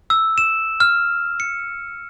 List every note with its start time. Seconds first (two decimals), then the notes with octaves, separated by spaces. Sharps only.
0.10 E6
0.38 E7
0.80 F6
1.40 C#7